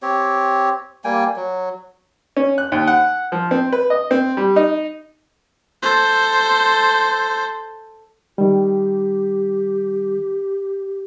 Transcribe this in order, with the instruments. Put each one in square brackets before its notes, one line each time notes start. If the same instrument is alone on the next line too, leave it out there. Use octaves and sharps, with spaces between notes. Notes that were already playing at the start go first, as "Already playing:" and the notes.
[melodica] C4 G4 C#5
G3 A#3 G5 G#5
F#3
[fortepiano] C#4
F#6
D#2
F#5
F3
C4
B4
D#5
C4
G3
D#4
[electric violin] A4 C5
[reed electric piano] D#3 G3 [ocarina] G4